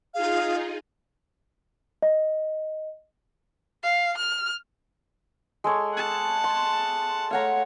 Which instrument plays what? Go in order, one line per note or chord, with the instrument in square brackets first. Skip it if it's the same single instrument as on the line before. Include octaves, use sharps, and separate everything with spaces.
[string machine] D#4 F4 G#4 [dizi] F5
[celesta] D#5
[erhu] F5
F6
[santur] G#3 A4 C#5
[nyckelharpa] F#5 A5
[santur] C6
[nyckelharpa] A3 C#5 [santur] F5 F#5 A#5